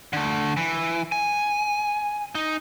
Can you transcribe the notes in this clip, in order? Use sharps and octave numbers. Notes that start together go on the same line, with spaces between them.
D3 A3
E3
G#5
D#4